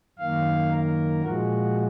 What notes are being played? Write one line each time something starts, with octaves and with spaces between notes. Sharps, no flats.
F#2 D#3 A#3 F5
A#4
A#2 F3 G#3 F#4